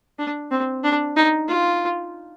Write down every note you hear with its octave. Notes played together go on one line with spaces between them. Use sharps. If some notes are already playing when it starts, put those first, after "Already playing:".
D4
C4
D4
D#4
F4